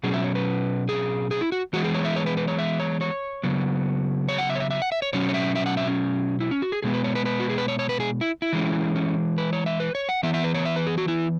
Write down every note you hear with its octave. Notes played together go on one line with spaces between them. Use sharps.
B2 F#3 C#4 G#4
E5
C#5
B4
G#4
G#4
E4
F#4
E3 G#3 B3 F#4
G#4
C#5
E5
C#5
B4
B4
C#5
E5
C#5
C#5
C#3 F#3 B3
C#5
F#5
E5
C#5
E5
E5
F#5
E5
C#5
B2 F#3 C#4 C#5
C#5
E5
E5
F#5
E5
C#4
E4
C#4
F#4
G#4
B2 G#3 B3 G#4
B4
C#5
B4
B4
F#4
G#4
B4
C#5
C#5
B4
G#4
E4
E4
E3 G#3 C#4
C#4
B4
C#5
E5
B4
C#5
F#5
E3 B3 E5
E5
B4
C#5
E5
B4
G#4
F#4
E4